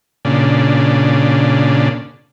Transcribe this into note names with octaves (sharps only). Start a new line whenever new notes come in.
A#2 C#3 D4